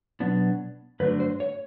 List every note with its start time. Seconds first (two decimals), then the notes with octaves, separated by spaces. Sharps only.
0.20 B2 F#3 B3 D4
1.00 G2 D3 F#3 A3 D4 B4
1.20 C5
1.40 C#5